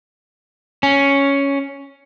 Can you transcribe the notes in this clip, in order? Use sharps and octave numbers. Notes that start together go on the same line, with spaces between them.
C#4